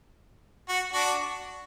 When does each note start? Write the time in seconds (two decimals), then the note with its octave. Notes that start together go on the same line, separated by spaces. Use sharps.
0.69 F#4
0.93 D4 F#4